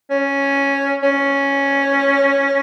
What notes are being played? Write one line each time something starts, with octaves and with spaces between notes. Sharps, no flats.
C#4
C#4